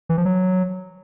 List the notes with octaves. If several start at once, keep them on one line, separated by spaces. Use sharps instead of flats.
E3
F3
F#3